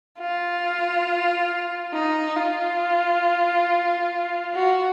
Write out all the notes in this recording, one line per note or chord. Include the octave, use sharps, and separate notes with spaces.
F4
D#4
F4
F#4